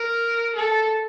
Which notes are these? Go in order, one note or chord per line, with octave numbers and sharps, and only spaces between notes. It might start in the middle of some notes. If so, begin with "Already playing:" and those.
Already playing: A#4
A4